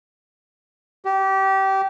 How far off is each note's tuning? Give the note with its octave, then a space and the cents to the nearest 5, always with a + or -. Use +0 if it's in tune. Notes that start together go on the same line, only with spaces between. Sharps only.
G4 -25